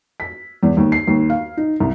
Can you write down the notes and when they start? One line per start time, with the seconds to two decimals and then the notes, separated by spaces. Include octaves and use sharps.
0.20 B6
0.63 E2
0.77 D#2
0.92 C7
1.07 D#2
1.30 F5
1.57 D#4
1.80 C2